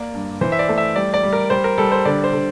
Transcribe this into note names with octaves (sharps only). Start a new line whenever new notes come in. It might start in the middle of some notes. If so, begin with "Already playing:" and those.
Already playing: A#3 D5
G2
E3 C5
E5
D5
A3
E5
G3 D5
D5
G3
A#4
G3 C5
A#4
G3 A4
C5
D3 D5
C5
D3